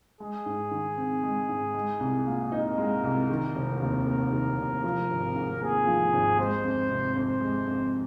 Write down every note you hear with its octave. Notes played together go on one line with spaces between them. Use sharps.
G#3 G#4
G#2
D#3
C4
G#3
G#2
G#3
C2
A#2
D#4 A#4
G#3
C2
D#3
F1
D#2
A#3
D#3
F1
F3 A#4
G#1
G#2
A#3 G#4
F3
G#1
G#3 C5
F2
C3
F2 C5
G#3
F2